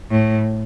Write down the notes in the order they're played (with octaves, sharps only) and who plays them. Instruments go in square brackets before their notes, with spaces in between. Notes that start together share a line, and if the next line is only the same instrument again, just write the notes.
[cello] A2